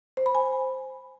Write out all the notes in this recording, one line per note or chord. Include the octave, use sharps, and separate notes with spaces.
C5
B5
G#5